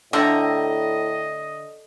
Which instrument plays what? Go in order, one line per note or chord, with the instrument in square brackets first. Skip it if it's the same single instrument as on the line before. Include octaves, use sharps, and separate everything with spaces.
[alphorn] A2 [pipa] D3 [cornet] D#5 [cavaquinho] E5 G5 A#5